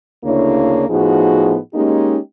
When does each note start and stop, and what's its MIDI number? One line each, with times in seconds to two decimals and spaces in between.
0.24 0.85 38
0.24 0.85 49
0.24 0.85 58
0.24 0.85 62
0.24 0.85 64
0.24 0.85 73
0.89 1.56 45
0.89 1.56 53
0.89 1.56 59
0.89 1.56 63
0.89 1.56 66
0.89 1.56 68
1.75 2.18 56
1.75 2.18 58
1.75 2.18 61
1.75 2.18 63
1.75 2.18 67